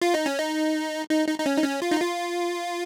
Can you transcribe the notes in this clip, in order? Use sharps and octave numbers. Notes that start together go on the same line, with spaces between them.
F4
D#4
C#4
D#4
D#4
D#4
D#4
C#4
D#4
C#4
F4
D#4
F4